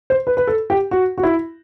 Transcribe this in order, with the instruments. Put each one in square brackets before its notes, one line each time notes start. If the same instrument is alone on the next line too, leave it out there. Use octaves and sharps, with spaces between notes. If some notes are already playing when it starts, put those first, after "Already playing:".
[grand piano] C5
B4
B4
A4
G4
F#4
F#4
E4